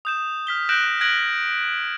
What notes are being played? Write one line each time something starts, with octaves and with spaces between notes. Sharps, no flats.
D#6 G6 E7
F6 B6 G7
F#6 G6 A#6 D7 E7 F#7
F#6 G#6 A#6 B6 D7 F#7